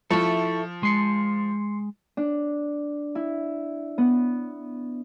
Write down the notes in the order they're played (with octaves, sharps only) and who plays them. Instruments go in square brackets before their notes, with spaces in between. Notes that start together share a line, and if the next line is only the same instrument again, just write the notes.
[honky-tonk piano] F3 [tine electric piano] E4 C#6 [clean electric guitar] A4 E5
[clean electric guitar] G#3 [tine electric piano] C6 C7 C#7
[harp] D4
E4
B3